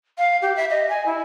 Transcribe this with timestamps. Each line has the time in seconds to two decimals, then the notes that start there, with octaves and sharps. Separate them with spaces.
0.18 F5
0.42 G4
0.56 E5
0.70 D#5
0.89 G#5
1.06 E4